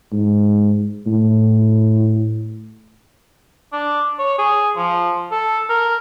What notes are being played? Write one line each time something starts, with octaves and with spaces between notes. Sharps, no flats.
G#2
A2
D4
C#5
G#4
F3
A4
A#4